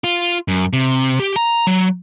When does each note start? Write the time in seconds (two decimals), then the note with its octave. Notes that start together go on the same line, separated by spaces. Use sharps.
0.04 F4
0.48 F#2
0.73 C3
1.20 G4
1.36 A#5
1.67 F#3